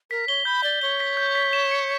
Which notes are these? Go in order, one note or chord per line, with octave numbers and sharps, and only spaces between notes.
A#4 B6
C#5 G7
B5 G6
D5 G7
C#5 G7
B6
G6
B6
E7
C#7